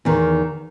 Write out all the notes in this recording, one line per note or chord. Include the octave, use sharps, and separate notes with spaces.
E2 D#3